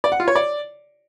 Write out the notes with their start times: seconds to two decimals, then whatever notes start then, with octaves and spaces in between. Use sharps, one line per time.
0.04 D5
0.12 F#5
0.20 F4
0.28 C#5
0.35 D5